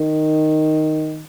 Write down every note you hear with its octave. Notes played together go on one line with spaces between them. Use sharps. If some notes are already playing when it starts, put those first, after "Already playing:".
Already playing: D#3